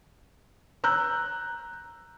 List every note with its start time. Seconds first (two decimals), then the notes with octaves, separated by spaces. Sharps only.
0.84 A#5 E6 F#6 G6